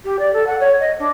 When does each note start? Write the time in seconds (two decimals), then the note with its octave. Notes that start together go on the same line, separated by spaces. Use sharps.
0.04 G4
0.19 D5
0.33 A4
0.46 F#5
0.60 C#5
0.79 D#5
0.99 D4